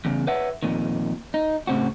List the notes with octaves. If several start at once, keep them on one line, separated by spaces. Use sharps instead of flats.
E2 C#3
B4 C#5 E5 F#5
F2 A#2 D#3
D#4
A2 C#3 C4 F#4